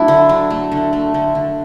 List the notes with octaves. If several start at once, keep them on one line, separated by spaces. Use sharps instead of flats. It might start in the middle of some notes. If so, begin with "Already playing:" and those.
Already playing: F#3 A3 D4 E4
D3
F#3
A3
D3
A3
D3
D3